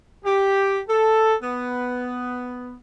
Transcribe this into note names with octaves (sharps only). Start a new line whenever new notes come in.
G4
A4
B3